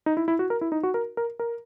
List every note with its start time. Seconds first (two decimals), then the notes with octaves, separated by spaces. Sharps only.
0.06 D#4
0.17 E4
0.28 E4
0.39 F#4
0.50 A#4
0.61 E4
0.72 D#4
0.83 F#4
0.94 A#4
1.17 A#4
1.39 A#4